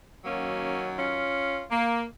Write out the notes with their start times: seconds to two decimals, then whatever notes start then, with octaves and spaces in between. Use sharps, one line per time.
0.24 F#2 D#3 F#3 A#3 C#4
0.97 C#4 F4
1.71 A#3